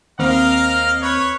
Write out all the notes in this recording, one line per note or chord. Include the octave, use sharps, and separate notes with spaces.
D#2 C4 A#4 D#5 F5 F6
B4 C#5